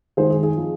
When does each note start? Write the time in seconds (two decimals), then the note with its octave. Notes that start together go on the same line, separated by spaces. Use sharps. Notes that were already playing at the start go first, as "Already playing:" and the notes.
0.17 D#3 G#3 D#4 G#4 C5
0.30 G#4
0.43 G#4
0.56 F3 C4 D#4